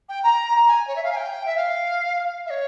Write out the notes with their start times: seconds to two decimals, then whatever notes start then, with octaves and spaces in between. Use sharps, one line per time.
0.09 G5
0.23 A#5
0.68 G#5
0.87 C#5
0.96 E5
1.03 F5
1.12 G#5
1.16 G5
1.46 E5
1.56 F5
2.46 E5
2.50 C#5